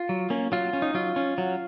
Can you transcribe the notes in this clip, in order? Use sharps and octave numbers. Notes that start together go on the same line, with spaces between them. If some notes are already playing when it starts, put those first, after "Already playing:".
Already playing: F4
F#3
A#3 C#4
F#3 F4
C#4
D#4
F#3 F4
C#4
F#3